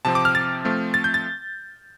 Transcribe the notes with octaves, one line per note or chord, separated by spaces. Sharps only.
C3 F3 C4 A5
D6
F6
A6
F3 A3 C4
A6
G6
A6